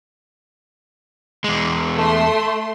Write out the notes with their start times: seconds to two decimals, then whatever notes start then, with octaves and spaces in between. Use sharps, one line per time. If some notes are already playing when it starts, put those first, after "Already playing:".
1.44 E2 G#3
1.95 A3 C6